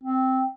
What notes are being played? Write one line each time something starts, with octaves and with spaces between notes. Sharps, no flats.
C4